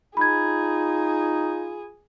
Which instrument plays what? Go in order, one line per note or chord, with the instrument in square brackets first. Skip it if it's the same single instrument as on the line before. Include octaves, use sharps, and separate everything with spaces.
[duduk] D#4 [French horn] F4 [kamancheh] G#4 [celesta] B5 G#6